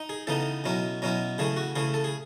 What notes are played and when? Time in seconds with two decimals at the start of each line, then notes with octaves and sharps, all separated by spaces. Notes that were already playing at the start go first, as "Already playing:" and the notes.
Already playing: D#4
0.09 G#4
0.27 C#3 E3 B3 D#4 A4
0.64 B2 F#3 C#4 E4
1.02 B2 F#3 C#4 E4
1.38 C#3 E3 A3 G#4
1.57 F#4
1.75 C#3 E3 A3 G#4
1.94 A4
2.04 G#4